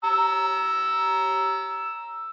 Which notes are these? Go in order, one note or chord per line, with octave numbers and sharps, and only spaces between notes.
A#5 E6